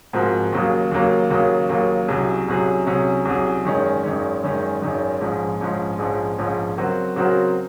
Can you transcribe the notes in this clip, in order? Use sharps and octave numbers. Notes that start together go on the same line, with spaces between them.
G#2 F3 C4 F#4 A#4
D#2 C#3 F#3 A#3
D#2 C#3 F#3 A#3
D#2 C#3 F#3 A#3
D#2 C#3 F#3 A#3
C2 C3 F#3 C#4 G#4
C2 C3 F#3 C#4 G#4
C2 C3 F#3 C#4 G#4
C2 C3 F#3 C#4 G#4
G#1 F#2 D#3 G#3 C#4
G#1 F#2 D#3 G#3 C#4
G#1 F#2 D#3 G#3 C#4
G#1 F#2 D#3 G#3 C#4
A#1 G#2 F3 G#3 C#4
A#1 G#2 F3 G#3 C#4
A#1 G#2 F3 G#3 C#4
A#1 G#2 F3 G#3 C#4
C#3 F#3 C4 F#4 A#4
C#3 F#3 C4 F#4 A#4